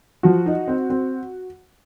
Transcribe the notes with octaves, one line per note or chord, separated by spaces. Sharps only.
F3 F#4
D#4
C4
C4